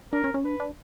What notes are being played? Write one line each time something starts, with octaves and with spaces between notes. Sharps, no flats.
D4 A#4
C#4
C#4
D4 B4
D4